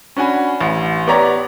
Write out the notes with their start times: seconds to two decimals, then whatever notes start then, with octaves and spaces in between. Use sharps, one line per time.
0.17 C#4 D4 F#4 G#5 B5
0.60 A1
1.07 B3 G4 C#5 D5 A#5